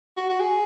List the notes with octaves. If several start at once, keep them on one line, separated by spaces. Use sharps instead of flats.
F#4
F#4
G#4